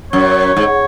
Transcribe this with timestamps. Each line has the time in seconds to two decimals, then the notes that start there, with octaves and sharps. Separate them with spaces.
0.13 F#2 C#5
0.56 G#2